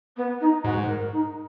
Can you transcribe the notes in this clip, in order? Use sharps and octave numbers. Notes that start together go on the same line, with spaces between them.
B3
D#4
G#2 F#4
A#4
D#4